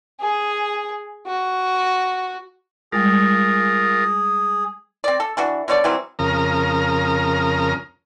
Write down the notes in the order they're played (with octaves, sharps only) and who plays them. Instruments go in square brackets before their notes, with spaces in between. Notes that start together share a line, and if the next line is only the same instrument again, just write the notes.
[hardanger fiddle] G#4
F#4
[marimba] G3 G#3 [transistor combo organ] F4 A#4 [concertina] G#4
[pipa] C4 D5
A4
E3 D4 F#4
B2 D3 C#5 D5
E3 F#3 G3 C4
[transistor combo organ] F2 C#3 A#4 A#5 D#6 F6